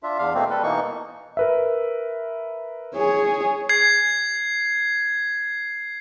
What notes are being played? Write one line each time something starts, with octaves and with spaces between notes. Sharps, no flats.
D4 F4 E5
E2 D4 F5
B2 A3 A#3 C4
G3 A4 B4
B2 E3 A#3 D#4 C#6
A#4 B4 E5
G#4 C#5
G#6 C7